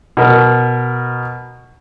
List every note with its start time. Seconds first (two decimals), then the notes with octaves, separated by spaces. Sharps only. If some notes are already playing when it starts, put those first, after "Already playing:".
0.17 B2 A#4